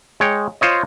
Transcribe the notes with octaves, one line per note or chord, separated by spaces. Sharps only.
G#3 C#5 G5
F4 C5 C#5 D#5